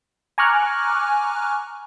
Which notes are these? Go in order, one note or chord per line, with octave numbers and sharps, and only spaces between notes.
G#5 A#5 C#6 D6 F6 F#6